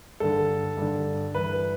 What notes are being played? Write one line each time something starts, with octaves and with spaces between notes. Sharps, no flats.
G2 D3 A4
G2 D3
G2 E3 B4